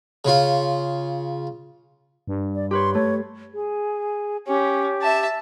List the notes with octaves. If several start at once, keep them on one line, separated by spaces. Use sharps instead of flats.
C#3 F4
G2
D5
G4 B4 C#5 C6
A3 C#5
G#4
C#4 G4
E5 A5